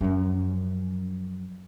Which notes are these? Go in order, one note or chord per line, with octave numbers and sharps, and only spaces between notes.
F#2 F3